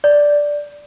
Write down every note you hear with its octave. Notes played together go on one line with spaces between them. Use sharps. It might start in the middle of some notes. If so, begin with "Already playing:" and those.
D5